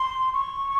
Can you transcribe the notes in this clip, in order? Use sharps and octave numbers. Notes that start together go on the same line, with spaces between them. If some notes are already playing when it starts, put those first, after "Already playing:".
Already playing: C6
C#6